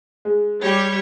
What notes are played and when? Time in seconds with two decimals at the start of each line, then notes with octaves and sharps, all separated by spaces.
0.25 G#3
0.62 G3 G4 C#5